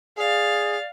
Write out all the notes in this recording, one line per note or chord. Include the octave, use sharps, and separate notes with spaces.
G#4 D5 F5